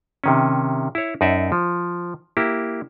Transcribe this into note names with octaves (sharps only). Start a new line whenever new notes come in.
C3 D#3 C#4
E4 C#5
F#2 D#4 D5 E5
F3
A#3 E4 G4